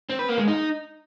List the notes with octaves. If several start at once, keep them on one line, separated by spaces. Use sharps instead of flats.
C4
B4
A#3
G#3
D#4